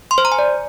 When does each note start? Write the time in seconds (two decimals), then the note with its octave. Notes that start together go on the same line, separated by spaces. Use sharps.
0.11 C6
0.18 C5
0.25 A#5
0.32 G#5
0.39 D5